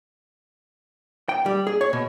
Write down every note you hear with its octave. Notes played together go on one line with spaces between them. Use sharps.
G5
G3
G#4
C#5
B2